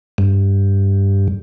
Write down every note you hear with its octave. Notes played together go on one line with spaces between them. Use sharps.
G2